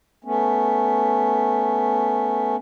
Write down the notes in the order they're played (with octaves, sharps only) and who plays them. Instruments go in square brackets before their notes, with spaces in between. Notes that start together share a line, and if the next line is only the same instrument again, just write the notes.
[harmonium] A3 B3 C#4